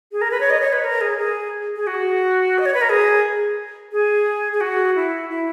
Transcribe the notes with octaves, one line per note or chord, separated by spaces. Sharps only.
G#4
A#4
B4
C#5
D#5
C#5
B4
A#4
G#4
G#4
G#4
F#4
D#5
C#5
B4
A#4
G#4
G#4
G#4
F#4
E4
E4